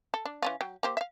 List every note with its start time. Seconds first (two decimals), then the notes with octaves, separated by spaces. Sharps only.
0.14 A4
0.25 D4
0.42 E3 C#4 F4
0.61 F#3 G5
0.83 A#3 G4 C5
0.97 E5 F5